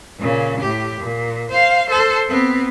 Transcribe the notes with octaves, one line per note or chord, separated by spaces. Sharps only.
A#2 C#3
A2 G4
A#2
C5 F5
A4 C5
B3 C4